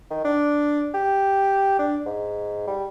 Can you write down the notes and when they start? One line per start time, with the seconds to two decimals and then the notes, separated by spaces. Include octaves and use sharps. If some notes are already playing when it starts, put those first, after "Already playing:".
0.10 D#3
0.25 D4
0.94 G4
1.79 D4
2.06 G#2
2.67 G3